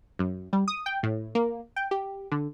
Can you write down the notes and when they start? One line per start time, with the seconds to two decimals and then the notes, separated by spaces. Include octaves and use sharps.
0.19 F#2
0.53 G3
0.68 D#6
0.86 G5
1.03 A2
1.35 A#3
1.76 G5
1.91 G4
2.32 D3